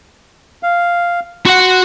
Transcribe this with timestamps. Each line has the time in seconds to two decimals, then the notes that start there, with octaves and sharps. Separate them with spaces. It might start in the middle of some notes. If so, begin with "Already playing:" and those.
0.63 F5
1.46 F#4 F#5 C6